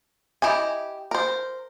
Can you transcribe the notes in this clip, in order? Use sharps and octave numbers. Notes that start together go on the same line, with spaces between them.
E4 G4 D#5 G#5
A#4 C5